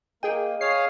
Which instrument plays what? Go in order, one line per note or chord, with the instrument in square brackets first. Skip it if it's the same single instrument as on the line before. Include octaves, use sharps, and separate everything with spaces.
[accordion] A#3 [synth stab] G#4 G5 [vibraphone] D#5
[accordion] G#4 C#5 F5 [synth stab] C7